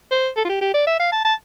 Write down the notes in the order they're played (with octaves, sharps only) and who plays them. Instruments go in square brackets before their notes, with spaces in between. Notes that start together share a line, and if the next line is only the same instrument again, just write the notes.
[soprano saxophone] C5
A4
F4
G4
G4
D5
E5
F5
A5
A5